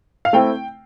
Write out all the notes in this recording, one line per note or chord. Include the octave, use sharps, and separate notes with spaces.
F5
A3 C4 E4 G5